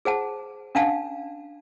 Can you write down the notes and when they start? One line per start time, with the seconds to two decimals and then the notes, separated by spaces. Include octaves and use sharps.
0.05 G#4 C5 F#5 A5
0.75 C#4 D4 F5 F#5 A5